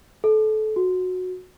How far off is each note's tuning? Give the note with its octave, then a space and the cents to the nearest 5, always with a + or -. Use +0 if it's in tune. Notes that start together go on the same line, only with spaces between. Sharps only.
A4 -25
F#4 -15